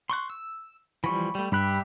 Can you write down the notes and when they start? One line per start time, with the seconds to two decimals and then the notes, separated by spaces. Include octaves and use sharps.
0.10 C6 C#6 F#6
0.30 E6
1.04 E3 F3 G3 B5 C#6
1.35 G3 A3
1.52 G2 G3 G4 E5 B5 F#6